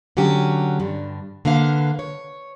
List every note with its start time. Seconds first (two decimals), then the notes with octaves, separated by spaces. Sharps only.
0.17 D3 F#3 C#4 G4
0.79 G2 D3
1.45 D3 A#3 B4 F5
1.99 C#5